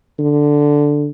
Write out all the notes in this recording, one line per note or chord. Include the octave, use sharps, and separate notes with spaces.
D3